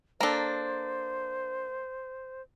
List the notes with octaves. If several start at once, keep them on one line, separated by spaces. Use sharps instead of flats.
A#3 D4 A4 C5 A#5